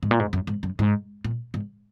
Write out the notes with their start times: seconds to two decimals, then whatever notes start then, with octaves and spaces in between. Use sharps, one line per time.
0.03 G#2
0.11 A#2
0.20 G#2
0.33 F#2
0.47 G#2
0.63 F#2
0.79 G#2
1.24 A#2
1.54 G#2